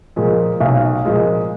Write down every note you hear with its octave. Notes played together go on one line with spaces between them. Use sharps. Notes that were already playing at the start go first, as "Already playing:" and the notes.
A#2 F3 G#3
B1
A#2 F3 G#3